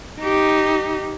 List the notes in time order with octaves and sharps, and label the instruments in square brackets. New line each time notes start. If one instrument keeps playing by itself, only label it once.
[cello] D#4 G4